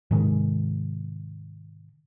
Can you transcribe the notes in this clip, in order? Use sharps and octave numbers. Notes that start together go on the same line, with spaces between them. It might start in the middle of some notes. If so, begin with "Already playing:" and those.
G#2 C3 D#3 G#3